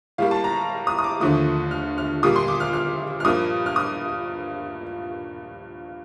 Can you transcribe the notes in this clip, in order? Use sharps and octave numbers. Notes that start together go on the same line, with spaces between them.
A2 G3 A#3 F5
A5
A#5
D#6
D#6
D6
D#2 D3 F3 A3 D#6
F6
F6
A#2 G3 A#3 D#6
C6
D6
F6
F6
F6
G2 F3 A#3 D#6
F6
D#6